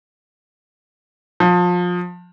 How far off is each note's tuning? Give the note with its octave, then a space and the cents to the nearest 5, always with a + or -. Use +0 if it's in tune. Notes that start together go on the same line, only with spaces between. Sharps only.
F3 +25